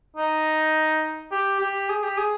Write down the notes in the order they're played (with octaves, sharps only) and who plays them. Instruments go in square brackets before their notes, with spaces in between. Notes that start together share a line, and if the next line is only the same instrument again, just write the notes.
[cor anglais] D#4
G4
G4
G#4
G4
G#4